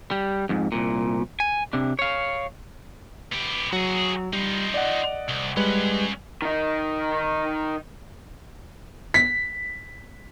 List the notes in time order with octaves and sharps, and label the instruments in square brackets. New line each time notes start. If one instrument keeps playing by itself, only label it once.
[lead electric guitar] G3
F2 G#2
C2 A#2
G#5
C3 D4
C#5 F5
[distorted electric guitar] B3 G4
[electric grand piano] F#3 [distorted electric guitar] F#4 G#4
[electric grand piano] G3 [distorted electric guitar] D#4 F4
[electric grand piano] D5 D#5 F#5
[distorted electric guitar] C2
[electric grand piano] G3 G#3 B4 [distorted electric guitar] C#4 F#5
[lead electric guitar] D#3 D#4
[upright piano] B6